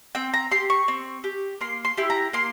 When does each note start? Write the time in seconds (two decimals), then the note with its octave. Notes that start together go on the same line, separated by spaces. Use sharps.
0.15 C4 G5
0.34 A#5
0.51 G4 C6
0.70 C#6
0.88 C4
1.24 G4
1.61 A#3 C6
1.85 C6
1.97 E4 G4
2.10 A#5
2.33 A#3 C6